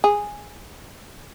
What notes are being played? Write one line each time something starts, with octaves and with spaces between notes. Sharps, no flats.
G#4